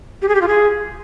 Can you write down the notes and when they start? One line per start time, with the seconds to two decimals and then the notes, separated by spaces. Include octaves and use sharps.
0.22 G4
0.28 G#4
0.35 G4
0.41 F4
0.48 G#4